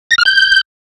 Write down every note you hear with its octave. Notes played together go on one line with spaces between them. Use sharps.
A#6
F6
G6